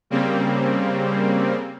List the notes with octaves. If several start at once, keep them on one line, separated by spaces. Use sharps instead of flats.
C#3 G3 A#3 C4